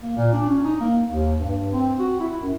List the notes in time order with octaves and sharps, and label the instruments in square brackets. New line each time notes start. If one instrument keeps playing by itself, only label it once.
[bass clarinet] A#3
A#2
D4
C#4
D#4
A#3
D#2
G2
C4
F#4
E4
F#2